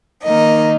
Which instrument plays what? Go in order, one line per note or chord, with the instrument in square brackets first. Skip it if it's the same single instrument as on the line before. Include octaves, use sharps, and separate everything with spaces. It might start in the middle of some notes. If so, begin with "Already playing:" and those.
[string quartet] D#3 A#3 D#4 D#5